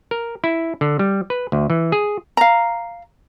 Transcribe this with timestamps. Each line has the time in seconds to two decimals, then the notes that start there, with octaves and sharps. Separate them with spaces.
0.11 A#4
0.44 E4
0.81 D3
0.99 G3
1.30 B4
1.52 D2
1.70 E3
1.92 G#4
2.37 F5 A#5